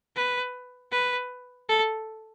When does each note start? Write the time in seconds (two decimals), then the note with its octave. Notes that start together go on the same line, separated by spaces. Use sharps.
0.16 B4
0.92 B4
1.69 A4